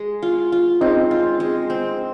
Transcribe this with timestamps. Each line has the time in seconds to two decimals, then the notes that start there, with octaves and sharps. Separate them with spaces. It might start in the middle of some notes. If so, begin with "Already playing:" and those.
Already playing: G#3
0.22 F4
0.52 F4
0.81 G#3 C4 D#4
1.11 F4
1.40 G#3
1.70 C4